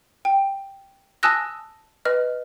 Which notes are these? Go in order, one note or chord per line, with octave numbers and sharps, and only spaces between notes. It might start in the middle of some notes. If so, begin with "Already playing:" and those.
G5
G#5 A5 D#6 E6 F#6 A#6
B4 D#5 F6